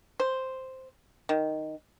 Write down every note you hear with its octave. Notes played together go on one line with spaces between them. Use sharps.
C5
D#3